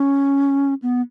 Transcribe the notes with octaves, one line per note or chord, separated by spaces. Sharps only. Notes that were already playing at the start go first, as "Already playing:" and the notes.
Already playing: C#4
B3